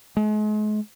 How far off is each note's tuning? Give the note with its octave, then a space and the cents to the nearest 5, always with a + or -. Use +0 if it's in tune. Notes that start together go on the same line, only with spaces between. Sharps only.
G#3 +40